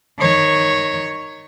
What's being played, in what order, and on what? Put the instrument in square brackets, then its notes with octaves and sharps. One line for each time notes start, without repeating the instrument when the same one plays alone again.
[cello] D#3 C#5